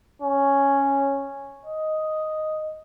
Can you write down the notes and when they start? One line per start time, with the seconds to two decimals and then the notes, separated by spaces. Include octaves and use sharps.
0.22 C#4
1.66 D#5